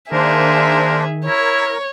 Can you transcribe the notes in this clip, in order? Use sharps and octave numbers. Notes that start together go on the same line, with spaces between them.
D#3 A#3 D4 G#4 A#4 C5 E5
E4 A#4 C#5